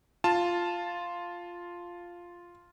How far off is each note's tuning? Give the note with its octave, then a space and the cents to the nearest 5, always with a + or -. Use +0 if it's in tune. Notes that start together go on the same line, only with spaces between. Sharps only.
F4 +0 A5 +0